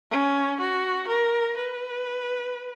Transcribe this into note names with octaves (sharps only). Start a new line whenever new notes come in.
C#4
F#4
A#4
B4